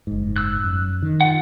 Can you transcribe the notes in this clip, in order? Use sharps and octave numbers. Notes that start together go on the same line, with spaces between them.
F#1 G#2
E6 F#6
F#2 F#3
D#3
F4 F#5